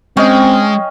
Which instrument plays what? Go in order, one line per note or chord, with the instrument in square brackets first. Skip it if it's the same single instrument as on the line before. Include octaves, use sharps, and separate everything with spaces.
[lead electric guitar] G#3 [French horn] C4 [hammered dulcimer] C#4 D#5 [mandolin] G5